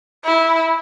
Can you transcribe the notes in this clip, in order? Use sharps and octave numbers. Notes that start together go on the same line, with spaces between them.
E4